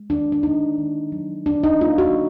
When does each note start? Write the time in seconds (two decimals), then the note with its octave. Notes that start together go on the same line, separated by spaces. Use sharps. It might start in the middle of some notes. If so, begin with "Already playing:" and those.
Already playing: G#3
0.10 D#3 D4
0.32 D4
0.43 A#3 D#4
0.78 D#3
1.12 F#3
1.46 D3 D4
1.63 D#4
1.81 A#3 F4
1.98 F#4